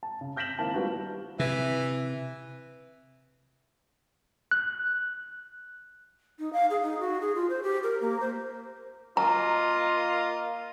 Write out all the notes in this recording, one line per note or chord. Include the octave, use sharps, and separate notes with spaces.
A5
C#3
F6 G6 A#6 B6 E7 F#7
D#3 A#3 C4 E4 A5
G3 B3 D4 F4 F#4
C3 E3
F#6
D#4
F5
G#4
D#4
F#4
G#4
F4
C5
G4
A#4
A#3
C5
A#3 F4 D#5 A#5